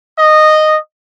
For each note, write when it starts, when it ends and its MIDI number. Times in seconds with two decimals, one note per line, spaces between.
0.19 0.78 75